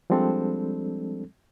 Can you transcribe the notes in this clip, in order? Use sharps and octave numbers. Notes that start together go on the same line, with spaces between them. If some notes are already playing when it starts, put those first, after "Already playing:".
F3 G3 G#3 C4 D4 A4